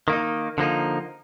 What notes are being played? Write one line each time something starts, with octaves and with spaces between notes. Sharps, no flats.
D#3 A#3 D#4
D3 F3 A#3 D#4